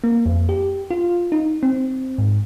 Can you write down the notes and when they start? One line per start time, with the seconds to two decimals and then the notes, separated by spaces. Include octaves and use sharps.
0.04 A#3
0.26 F2
0.49 G4
0.91 F4
1.32 D#4
1.63 C4
2.18 G#2